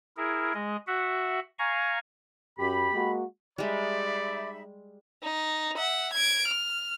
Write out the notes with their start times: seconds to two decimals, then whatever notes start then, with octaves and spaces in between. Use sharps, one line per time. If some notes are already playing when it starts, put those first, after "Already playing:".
0.17 E4 G#4 A#4
0.54 G#3 G#4 D#5
0.87 F#4 E5 F#5
1.59 F5 G#5 A#5 C#6
2.59 F#2 G4 B5
2.92 G#3 A#3 F#4
3.58 G3 G#3 D#4 D5 E5 B5
5.22 D#4
5.77 E5 F#5
6.13 G#6 D7
6.47 F6